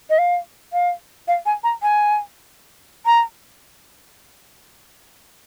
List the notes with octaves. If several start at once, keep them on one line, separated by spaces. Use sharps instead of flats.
D#5
F5
F5
F5
G#5
A#5
G#5
A#5